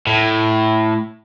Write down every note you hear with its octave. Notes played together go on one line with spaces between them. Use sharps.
A2